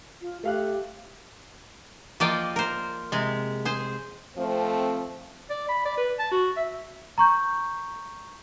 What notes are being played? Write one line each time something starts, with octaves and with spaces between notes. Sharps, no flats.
F4
A3 G4 F5 F#6
F3 A#3 D5 D#5 F5 G5
A#4 C5
C3 G#3
G#4 C5
F3 A3 C4
D5
B5
D5
B4
A5
F#4
E5
A#5 C#6 G6